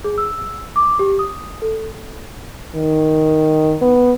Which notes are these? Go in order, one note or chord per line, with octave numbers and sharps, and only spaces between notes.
G#4
E6
D6
G4
D#6
A4
D#3
B3